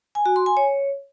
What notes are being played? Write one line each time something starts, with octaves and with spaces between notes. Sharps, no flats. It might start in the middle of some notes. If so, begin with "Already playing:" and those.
G#5
F#4
C6
G#5
C#5